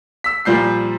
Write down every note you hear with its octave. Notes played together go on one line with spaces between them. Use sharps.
E6 B6
A#2 F3 G3 G6 C7